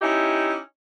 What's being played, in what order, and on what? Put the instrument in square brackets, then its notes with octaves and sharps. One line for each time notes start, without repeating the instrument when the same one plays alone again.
[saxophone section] C#4 D#4 E4 G4